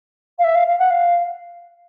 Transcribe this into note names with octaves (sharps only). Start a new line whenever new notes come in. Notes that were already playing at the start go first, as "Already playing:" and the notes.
F5
E5
F5
F5
F#5
F5